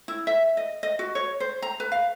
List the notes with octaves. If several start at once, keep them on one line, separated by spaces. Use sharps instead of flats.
E4
E5
D#5
D#5
F#4
C#5
C5
A#5
B4
F5